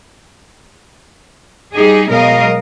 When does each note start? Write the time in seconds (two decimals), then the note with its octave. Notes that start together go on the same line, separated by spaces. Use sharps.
1.74 G3 D#4 G4 G#4
2.09 B2 F#3 G#3 A#4 D#5 F5